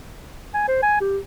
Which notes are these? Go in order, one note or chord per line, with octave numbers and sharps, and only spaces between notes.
G#5
C5
G#5
G4